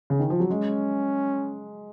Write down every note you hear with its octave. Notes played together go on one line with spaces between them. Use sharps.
C#3
D#3
F3
F#3
G#3 C#4